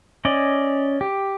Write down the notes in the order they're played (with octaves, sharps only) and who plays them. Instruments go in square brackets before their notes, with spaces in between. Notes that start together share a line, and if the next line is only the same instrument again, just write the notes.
[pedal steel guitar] C#4 D5 D#5
G4